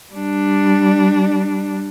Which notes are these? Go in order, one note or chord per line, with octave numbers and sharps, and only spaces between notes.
G3 D4